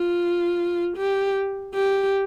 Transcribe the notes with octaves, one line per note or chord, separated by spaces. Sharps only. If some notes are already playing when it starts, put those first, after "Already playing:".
Already playing: F4
G4
G4